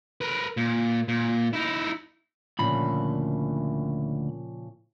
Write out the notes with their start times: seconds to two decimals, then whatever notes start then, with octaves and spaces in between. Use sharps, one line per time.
0.21 A#4 B4
0.57 A#2
1.08 A#2
1.53 D#4 E4
2.59 D2 A#2 C#3 F3 B5